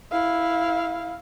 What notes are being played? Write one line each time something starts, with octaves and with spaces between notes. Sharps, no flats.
E4 F5